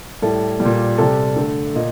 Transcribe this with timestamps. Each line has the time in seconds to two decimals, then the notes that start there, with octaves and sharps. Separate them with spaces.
0.22 A2 G3 A4
0.60 G3
0.65 A#2
0.98 C3 G3 A4
1.36 D3 A3
1.75 A#2 D#5